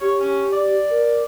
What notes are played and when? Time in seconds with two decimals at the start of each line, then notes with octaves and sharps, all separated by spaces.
0.01 G4 C#5
0.20 C#4
0.52 D5
0.90 A#4